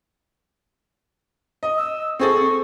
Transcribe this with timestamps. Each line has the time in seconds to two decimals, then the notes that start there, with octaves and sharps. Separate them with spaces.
1.63 D#5
1.77 E6
2.19 C4 G#4 A4 C#6